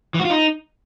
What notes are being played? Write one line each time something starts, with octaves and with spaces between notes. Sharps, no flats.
E3
F#4
F4
D#4